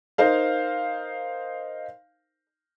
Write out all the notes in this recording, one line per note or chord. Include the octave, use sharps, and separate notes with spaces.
D#4 A#4 C5 F5